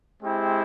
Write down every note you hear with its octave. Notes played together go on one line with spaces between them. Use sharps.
G#3 C4 E4 G4